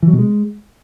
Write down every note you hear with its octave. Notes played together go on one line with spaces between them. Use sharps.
E3
F#3
B2
G#3